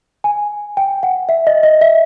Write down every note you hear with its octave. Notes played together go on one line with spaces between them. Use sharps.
G#5
G5
F#5
E5
D#5
D#5
E5